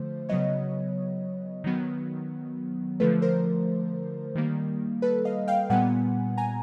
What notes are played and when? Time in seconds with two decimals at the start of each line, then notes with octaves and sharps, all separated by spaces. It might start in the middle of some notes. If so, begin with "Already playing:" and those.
Already playing: D3 F3 A3 C5
0.29 C#3 F#3 B3 C#5 D#5
1.64 D#3 F#3 B3
3.00 D3 F3 A3 A4 B4
3.22 A#4 C5
4.35 D#3 G3 A#3
5.02 A4 B4
5.25 D#5 F5
5.48 F5 G5
5.70 A#2 G3 B3 F#5 G#5
6.37 G#5 A#5